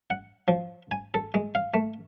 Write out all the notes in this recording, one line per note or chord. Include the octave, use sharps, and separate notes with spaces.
F#5
F3
G#5
A4
G#3
F5
A3